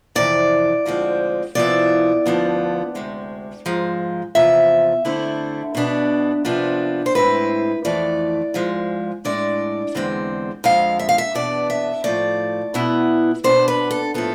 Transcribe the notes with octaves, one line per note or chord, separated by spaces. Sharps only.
F2 C3 E3 D5
D2 D3 F3 G#3 C4
C3 F3 B3 E4 D5
D2 D3 F3 B3
D2 C3 G#3
G#2 F3 G#3
E2 C3 F3 E5
D3 A3 C4 E4
B2 B3 D4
C3 F3 B3 D4
C5
A2 G#3 C4 E4 B4
F2 E3 A3 D5
G#2 F3 G#3
A2 G#3 D4 D5
E2 D3 G#3 C4
F2 D3 G#3 F5
E5
F5
E5
E2 B2 B3 D4 D5
E5
A2 F3 A3 D5
B2 B3 E4
B2 B3 D4 C5
B4
A4
A2 F3 B3 A4